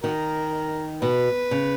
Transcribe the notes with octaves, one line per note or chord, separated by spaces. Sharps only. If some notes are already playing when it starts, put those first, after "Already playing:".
D#3 F#4 A#4
B2 B4
C#3